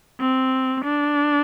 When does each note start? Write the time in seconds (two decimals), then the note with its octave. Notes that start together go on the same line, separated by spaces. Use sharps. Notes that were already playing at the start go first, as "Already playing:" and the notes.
0.20 C4
0.84 D4